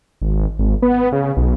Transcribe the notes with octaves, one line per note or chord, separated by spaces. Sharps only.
G#1
G#1
B3
C#3
B1